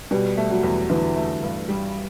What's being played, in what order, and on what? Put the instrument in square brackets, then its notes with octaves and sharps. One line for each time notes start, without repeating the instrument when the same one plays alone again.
[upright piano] B2 [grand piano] G3
[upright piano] A3
[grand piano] F#3
[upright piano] E2
[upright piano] D3 [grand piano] E3
[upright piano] A3
G2
G3